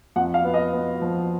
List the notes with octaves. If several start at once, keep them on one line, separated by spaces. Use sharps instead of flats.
F2 F#5
F5
B3
D#5
B3
F3